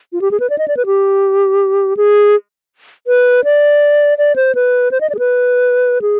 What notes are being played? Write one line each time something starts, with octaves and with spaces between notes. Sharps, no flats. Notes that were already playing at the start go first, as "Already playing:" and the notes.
F4
G4
G#4
B4
D5
D#5
D5
B4
G4
G#4
B4
D5
D5
C5
B4
C5
D#5
D5
G#4
B4
G#4